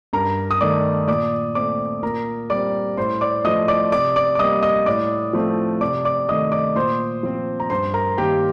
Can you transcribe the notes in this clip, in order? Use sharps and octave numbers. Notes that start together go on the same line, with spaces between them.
G2 A#4 A#5
D#6
D#3 A3 D5 D6
A#2 D5 D6
A3 C4 D5 D6
A#2 A#4 A#5
G3 C4 D5 D6
A2 C5 C6
D5 D6
F3 A3 D#5 D#6
D5 D6
C3 D5 D6
D5 D6
D6
G3 A#3 D#5 D#6
D#5 D#6
A2 D5 D6
F3 A3 C4
C3 D5 D6
D5 D6
D#3 A3 D#5 D#6
D5 D6
A#2 C5 C6
F3 C4
A#5
G2 C5 C6
A#4 A#5
D#3 A#3 G4 G5